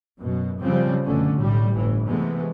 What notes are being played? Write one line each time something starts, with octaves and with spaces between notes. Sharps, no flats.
F#2 B2
C#3 F3 G3 C4
F#1 B2 D3 A3 C#4
B1 A2 G3
G1 A2 E3
C3 E3 G#3 A3 B3